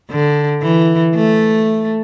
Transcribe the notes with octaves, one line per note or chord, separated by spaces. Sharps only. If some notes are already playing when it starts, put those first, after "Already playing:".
D3
E3
A3